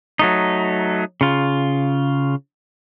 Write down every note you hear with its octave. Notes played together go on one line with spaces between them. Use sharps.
F#3 A3 D#4
C#3 F4